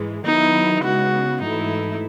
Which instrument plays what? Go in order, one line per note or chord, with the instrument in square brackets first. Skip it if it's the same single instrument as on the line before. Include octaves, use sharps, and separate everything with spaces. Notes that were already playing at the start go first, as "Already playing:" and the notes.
Already playing: [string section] G#2 E3 G#3
[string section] D#3 F#3 B3 E4 [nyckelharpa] D#4
[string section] C#3 G#3 B3 [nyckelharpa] F#4
[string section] G#2 E3 A3 E4 [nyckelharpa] D#4